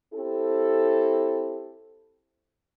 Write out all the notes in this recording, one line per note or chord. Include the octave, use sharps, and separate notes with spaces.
C4 E4 G4 A4